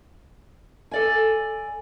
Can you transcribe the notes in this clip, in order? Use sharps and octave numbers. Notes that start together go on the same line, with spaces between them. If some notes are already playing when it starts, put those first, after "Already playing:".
A4 D5 G#5